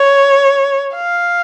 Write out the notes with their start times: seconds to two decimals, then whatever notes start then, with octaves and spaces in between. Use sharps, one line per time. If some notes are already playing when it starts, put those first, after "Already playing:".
Already playing: C#5
0.95 F5